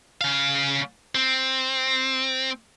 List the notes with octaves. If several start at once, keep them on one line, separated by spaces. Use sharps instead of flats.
C#3 F5
C4